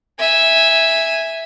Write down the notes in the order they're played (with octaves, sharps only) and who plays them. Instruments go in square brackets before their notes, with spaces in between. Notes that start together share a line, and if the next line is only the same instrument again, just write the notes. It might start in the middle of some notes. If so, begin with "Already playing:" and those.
[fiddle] E5 G#5